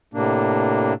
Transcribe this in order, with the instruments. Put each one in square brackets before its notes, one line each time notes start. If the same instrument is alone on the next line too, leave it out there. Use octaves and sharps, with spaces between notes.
[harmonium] A2 C3 A#3 D4